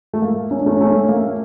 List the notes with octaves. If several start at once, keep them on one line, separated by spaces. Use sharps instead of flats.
A3
A#3
C#4
D4
A3 C#4
A3 C#4
A#3